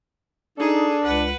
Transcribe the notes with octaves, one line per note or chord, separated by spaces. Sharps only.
D4 D#4 G#4 A4
C#2 B4 F#5